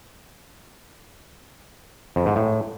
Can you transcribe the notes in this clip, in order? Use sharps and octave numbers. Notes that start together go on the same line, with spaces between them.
F2
G#2
A2